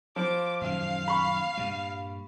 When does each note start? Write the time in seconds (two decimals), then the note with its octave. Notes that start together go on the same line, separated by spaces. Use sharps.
0.16 F3 D6
0.61 D#1 F#2 D#3 F5
1.08 B5 C#6
1.57 G2 A#2 G3